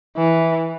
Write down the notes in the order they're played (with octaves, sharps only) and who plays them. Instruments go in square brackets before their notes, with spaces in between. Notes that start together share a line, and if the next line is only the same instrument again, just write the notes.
[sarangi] E3